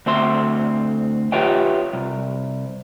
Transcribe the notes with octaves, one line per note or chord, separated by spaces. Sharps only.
D2 C4 E5 C6
F4 G4 B4 C#5 E5 G5
C2